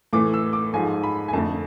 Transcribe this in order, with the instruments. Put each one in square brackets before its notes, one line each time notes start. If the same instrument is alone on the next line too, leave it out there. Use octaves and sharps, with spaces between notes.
[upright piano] A2 E3 A3 D6
E6
D6
G#2 F3 A3 G#5
B5
G#5
F2 D3 A3 A5